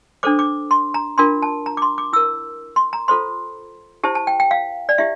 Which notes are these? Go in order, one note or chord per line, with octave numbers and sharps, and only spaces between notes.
D4 A4 C5 D6
D6
C6
A#5
D4 F4 A#4 C6
A5
A#5
D6
C6
D6
E4 A#4 E6
C6
A#5
F4 A4 C5 C6
E4 G4 C5 A5
A5
G5
G5
F5
D5
E4 G4 E5